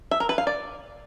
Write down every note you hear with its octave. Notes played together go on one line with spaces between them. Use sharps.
E5
A#4
B4
F5
D5